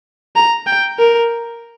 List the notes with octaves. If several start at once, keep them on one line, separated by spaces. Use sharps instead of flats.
A#5
G5
A#4